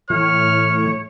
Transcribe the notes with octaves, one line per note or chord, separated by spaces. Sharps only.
A2 E3 C#5 F6